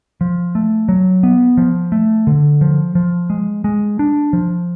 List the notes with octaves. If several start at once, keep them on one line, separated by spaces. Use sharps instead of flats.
F3
A3
F#3
B3
F3
A3
D3
F3
F3
G#3
G#3
D4
F3